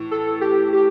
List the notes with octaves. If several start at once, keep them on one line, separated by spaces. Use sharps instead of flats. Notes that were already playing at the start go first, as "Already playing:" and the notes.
Already playing: A2 E3
A4
G4
G4